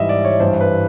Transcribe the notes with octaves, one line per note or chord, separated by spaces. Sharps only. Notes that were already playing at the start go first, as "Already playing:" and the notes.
Already playing: G#2 E3 G3 D#5 E5
D5
C#5
G2 E3 G3 C5
B4